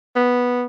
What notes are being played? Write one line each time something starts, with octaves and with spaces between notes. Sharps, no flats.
B3